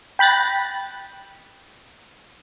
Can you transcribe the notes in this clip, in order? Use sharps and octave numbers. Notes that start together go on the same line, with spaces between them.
G5 B5 F#6 A6 A#6